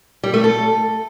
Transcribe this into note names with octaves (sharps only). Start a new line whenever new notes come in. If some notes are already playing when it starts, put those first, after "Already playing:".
G3
A3
A4